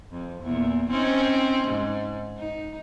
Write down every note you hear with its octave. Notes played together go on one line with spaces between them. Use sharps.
F2
E2 A#2
C4 C#4 D#4
G#2
D#4